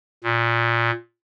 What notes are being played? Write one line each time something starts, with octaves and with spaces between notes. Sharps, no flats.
A#2